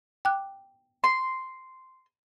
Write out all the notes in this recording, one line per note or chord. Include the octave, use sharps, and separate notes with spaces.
G5 D6 F#6
C6